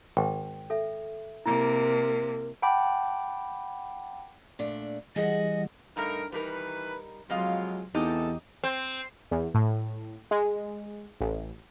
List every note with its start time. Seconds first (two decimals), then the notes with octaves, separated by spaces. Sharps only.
0.17 G#1 G5
0.70 A4 E5
1.46 C3 A#3 E4 A#4
2.62 F#5 G5 A5 B5 D6
4.59 A#2 A3 D4
5.16 E3 G3 G#4 D#5 F#5
5.97 G2 A3 D#4 A#4
6.32 D#3 E3 G3 D#4 A#4 B4
7.30 F2 C3 F#3 G#3 F4 D#5 F5
7.94 E2 C3 E3 D#4 G4 A4 D#5
8.64 C4
9.31 E2
9.54 A2
10.31 G#3
11.21 A1